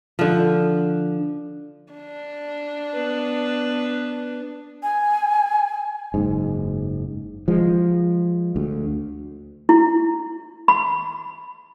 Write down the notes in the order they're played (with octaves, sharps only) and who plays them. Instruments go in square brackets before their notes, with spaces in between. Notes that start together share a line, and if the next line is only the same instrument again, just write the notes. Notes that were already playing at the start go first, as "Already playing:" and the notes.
[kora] D3 F3
[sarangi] D4
[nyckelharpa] B3 B4
[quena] G#5
[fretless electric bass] F#1 G#2
F3 G#3
D2
[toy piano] E4
B5